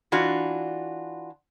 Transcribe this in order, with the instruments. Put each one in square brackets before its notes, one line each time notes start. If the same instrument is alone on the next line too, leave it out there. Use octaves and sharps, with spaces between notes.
[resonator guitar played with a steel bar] E3 D4 F4 F#4